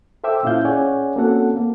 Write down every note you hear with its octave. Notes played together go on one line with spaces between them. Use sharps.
A4 C5 E5 G5 D6 E6
A#2 C#4 E4 F4 F5 G6
C#4 G#4 C#5 D5 F#5 G#5
A#3 C4 C#4 F#4 A4 F#5
A#3